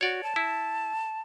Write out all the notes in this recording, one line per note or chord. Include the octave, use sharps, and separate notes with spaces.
F#4 C#5 D5
A5
E4